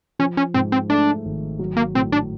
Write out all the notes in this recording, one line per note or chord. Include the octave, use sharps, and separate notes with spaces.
F3 C#4
C#4
G#2 C4
C4
A3 D4
G#1
F#3
A#3
A2 C4
D4